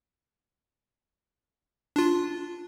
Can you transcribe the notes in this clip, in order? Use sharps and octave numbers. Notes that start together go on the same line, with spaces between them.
D4 F4